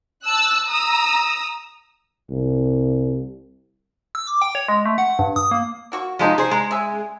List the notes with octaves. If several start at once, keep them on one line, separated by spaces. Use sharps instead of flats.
A5 E6 F#6
A#5 D#6 E6
C2
E6
D6
G5
C#5
G#3
A3
F#5
G2
D#6
A#3
A#3 F#4 C#6
D#3 F3 G3 G#3 D#4
G#4 C5
G#3 A#5
G#4 E5 G#5